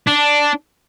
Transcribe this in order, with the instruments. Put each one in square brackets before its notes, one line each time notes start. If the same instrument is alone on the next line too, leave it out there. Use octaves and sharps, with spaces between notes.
[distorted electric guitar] D4